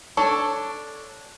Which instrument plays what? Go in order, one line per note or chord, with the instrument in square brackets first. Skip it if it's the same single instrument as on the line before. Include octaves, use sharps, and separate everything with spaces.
[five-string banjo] D4 A4 C#5